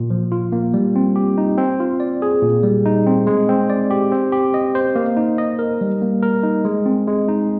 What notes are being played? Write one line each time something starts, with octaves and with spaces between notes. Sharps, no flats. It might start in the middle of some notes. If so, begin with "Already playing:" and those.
Already playing: A#2
F3
F4
A#3
G3
C4
G4
D#4
C4
F4
D5
G#4
A#2
G3
D#4
C4
G#3
C4
D5
G4
C4
G4
D#5
C5
A#3
D#4
D#5
A#4
G3
A#3
A#4
D#4
G#3
C4
G#3
D#4